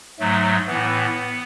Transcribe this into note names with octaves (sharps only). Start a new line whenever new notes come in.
G#2 F#3 A3
A2 E3 B3